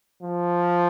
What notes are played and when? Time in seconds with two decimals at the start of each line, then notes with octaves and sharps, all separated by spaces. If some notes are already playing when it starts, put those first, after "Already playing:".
0.22 F3